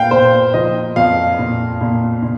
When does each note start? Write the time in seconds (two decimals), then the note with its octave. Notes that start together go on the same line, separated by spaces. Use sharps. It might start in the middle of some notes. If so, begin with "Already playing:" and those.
Already playing: A#2 F5 G5
0.11 A#2 C5
0.54 F3 D#5
0.96 F2 F5
1.39 A#2
1.81 A#2
2.22 A#2